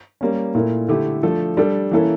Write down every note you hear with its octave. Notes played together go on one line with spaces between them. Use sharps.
G3 A#3 C#4
A#2 A3 E4 A#4
D3 A3 E4 G4
F3 A3 D4 A4
G3 D4 A4
E3 A#3 C#4 E4 A4